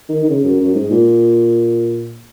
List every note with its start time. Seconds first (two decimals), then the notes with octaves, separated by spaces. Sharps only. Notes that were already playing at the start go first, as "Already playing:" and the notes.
0.09 D#3
0.24 D#3
0.29 C#3
0.44 F#2
0.60 F#2
0.75 G#2
0.91 A#2